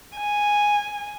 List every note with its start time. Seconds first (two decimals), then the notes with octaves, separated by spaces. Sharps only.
0.16 G#5